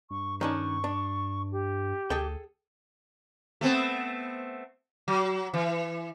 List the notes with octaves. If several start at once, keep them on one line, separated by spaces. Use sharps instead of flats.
G2 C#6
D#3 C#4 D4 C#6
D4
G4
D2 G#4 A4 G5
A3 B3 C4
F#3
E3